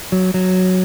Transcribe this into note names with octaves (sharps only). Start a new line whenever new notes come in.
F#3
F#3